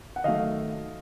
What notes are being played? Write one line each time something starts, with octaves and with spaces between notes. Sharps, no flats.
F#5
D#3 F#3 A3 D#5 F5